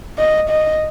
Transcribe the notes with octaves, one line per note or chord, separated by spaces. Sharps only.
D#5
D#5